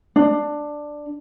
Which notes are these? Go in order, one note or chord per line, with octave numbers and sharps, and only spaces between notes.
D4